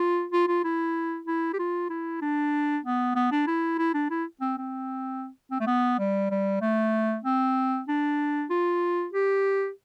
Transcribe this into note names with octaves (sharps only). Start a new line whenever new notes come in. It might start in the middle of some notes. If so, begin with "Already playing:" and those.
Already playing: F4
F4
F4
E4
E4
G4
F4
E4
D4
B3
B3
D4
E4
E4
D4
E4
C4
C4
C4
A3
B3
G3
G3
A3
C4
D4
F4
G4